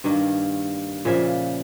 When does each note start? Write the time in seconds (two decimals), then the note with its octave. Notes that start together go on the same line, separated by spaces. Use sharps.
0.04 G2 D#3 A#3
1.05 A#2 C#3 F3 E5